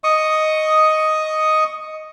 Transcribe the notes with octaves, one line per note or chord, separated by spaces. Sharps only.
D#5 C#6 D#6